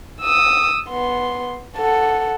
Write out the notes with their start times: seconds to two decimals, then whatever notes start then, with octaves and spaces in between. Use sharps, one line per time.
0.21 D#6 E6
0.89 B3 C6
1.77 A4 F#5